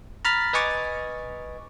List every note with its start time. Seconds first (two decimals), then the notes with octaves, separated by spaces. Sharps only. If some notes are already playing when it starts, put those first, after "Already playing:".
0.25 A#5 B5 F6 A6 B6
0.53 B4 D#5 G#5 C#6 D6 A6